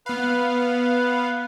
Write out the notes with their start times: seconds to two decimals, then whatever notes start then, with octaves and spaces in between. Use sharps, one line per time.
0.06 B3 B4 F5 B5